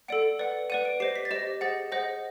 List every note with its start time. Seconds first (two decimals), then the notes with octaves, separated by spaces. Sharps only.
0.08 A4 D5 F#5 D7
0.39 B4 D5 F#5
0.70 B4 D5 F#5 D#7
0.85 D7
1.00 G4 C5 D#5 C7
1.16 B6
1.25 A6
1.31 G4 C5 D#5 A#6
1.61 G#4 C5 D#5 F#5 A6
1.92 G#4 C5 D#5 F#5 A#6